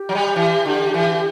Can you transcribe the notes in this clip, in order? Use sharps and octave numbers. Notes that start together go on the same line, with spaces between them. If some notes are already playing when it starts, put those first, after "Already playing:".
Already playing: G4
F#3
G3
E3
D3
E3